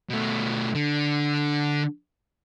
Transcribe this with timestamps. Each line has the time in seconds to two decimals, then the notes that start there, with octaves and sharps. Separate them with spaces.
0.10 B2 A3
0.75 D3